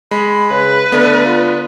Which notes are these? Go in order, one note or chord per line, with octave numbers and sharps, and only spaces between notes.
G#3 B5
C#3 B4
D3 A3 B3 D5
F4